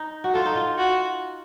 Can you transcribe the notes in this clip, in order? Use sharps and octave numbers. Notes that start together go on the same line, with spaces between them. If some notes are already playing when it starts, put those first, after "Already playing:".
Already playing: D#4
F#4
F4 A4
D#4
F4
F#4